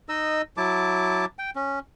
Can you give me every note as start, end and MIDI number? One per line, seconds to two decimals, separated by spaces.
0.09 0.42 63
0.09 0.42 75
0.09 0.42 88
0.57 1.25 54
0.57 1.25 64
0.57 1.25 81
0.57 1.25 86
1.39 1.50 79
1.56 1.79 61